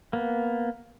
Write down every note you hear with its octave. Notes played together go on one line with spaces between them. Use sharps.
A#3 B3